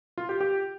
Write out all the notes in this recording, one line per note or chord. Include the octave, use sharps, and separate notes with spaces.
F4
G4
G4